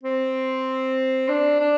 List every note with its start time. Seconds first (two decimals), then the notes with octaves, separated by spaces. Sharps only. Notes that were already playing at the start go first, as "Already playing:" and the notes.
0.03 C4
1.29 D4
1.60 D4